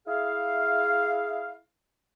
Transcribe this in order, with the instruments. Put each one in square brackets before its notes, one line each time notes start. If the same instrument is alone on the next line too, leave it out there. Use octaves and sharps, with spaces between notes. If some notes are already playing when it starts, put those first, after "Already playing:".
[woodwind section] E4 G#4 F5